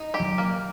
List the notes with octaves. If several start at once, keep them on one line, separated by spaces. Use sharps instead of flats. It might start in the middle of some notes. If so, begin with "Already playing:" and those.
Already playing: D#4
G4
F3
F#3
A#3